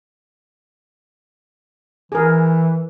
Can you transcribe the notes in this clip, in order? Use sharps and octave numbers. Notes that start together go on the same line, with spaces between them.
E3 G#4 A#4